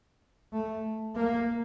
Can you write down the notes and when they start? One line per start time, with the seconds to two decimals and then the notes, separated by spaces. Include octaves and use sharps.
0.52 A3
1.16 A#3